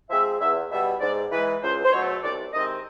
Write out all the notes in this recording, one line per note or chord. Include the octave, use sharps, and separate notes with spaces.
F3 G#3 C4 E5
E2 E5
B2 G3 B3 E5
G#2 D5
E3 G#3 B4
C#2 C5
C5
B2 F#3 A3 C#5
C2 D5
C3 D#3 G#3 C4 D#5